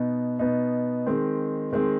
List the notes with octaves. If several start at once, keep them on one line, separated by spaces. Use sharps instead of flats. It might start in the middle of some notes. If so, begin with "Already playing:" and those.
Already playing: B2 B3 D#4
B2 B3 D#4
D#3 G#3 C4
D#3 G#3 C4